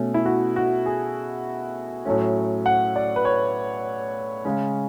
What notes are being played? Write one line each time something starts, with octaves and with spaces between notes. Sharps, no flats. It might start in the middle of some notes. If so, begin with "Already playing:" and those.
Already playing: B2 A3 C#4
E4
F#4
F#4
G#4
A2 F#3 A3 C#4
F#5
D5
B4
C#5
C#3 G#3 C#4